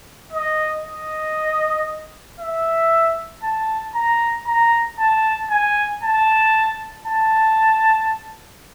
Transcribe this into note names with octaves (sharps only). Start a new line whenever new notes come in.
D#5
D#5
E5
A5
A#5
A#5
A5
G#5
A5
A5